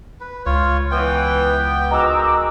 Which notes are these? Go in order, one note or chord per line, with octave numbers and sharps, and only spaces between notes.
B4
C#2 F4 C#5
E3 B3 G5
D#3 G#3 F#4 A#5 D6 E6